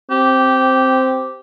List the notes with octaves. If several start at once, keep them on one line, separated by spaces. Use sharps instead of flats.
C4 G4